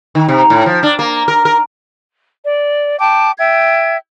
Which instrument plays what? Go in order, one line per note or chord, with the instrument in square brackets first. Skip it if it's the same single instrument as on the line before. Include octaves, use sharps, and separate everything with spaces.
[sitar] D#3
C3
A2
F3
D4
A#3
A#4
A#4
[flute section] D5
G5 A5 D6
E5 G5 G#6